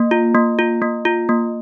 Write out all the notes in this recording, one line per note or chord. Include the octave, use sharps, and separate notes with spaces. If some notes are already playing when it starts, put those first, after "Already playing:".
Already playing: A#3
F4
A#3
F4
A#3
F4
A#3